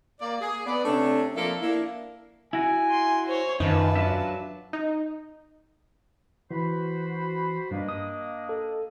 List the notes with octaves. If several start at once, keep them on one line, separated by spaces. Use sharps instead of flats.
A#3 D5
G#4
B3 D5
C3 A3 C#4 D4
F3 A#3 C4 A4 D5 E5
A#3 D4 E4
E4 F#4 G#5
C6
C5 C#5
F#2 D#3 D#4 F4 B4 A5
F#3 D4 E5
D#4
E3 F#4 C5 B5
G2 A#3 D4 D#5
D#6
A4